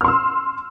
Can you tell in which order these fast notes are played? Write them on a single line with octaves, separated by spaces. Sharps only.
F6 C6 E6